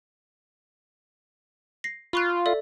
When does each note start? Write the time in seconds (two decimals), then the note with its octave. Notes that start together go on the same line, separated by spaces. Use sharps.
1.84 A#6 C7
2.13 F4 B5 C#6 F#6
2.46 A4 D5 E5